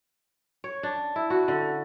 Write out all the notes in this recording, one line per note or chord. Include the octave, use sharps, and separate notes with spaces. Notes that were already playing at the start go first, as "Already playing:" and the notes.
C#5
D4
E4
F#4
D3